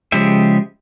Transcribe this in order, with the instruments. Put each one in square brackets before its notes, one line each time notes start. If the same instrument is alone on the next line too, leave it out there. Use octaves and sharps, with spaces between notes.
[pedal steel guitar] C#3 F3 G#3 G4 E5